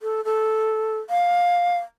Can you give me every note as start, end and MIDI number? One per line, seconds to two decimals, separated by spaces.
0.01 0.24 69
0.25 0.99 69
1.10 1.78 77